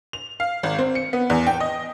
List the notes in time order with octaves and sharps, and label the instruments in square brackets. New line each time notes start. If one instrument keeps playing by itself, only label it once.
[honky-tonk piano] F7
F5
G#1
C4
C#7
B3
E2
G5
D#5